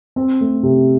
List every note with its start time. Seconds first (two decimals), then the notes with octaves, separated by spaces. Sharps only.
0.16 C4
0.41 A3
0.63 C3